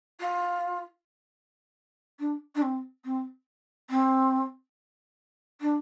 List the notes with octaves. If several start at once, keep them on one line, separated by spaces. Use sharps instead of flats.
F4
D4
D4
C4
C4
C4
D4